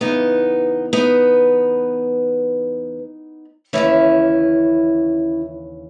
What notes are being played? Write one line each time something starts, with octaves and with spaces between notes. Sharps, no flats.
E2 C#3 E3 B3 D#4
B3 D#4
D#2 C#3 E3 C#4 E4